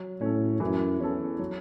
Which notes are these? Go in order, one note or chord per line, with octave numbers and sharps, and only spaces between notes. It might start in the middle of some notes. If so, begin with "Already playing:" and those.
Already playing: F#3
A2 C#4 A4
F#2 E3
E2 C#4 A4
F#3